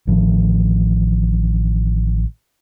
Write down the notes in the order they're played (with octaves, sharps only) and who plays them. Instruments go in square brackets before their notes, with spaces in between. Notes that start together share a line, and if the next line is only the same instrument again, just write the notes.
[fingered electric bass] A1 A2 D#3 F3